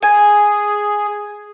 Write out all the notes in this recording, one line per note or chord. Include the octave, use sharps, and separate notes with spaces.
G#4 G#5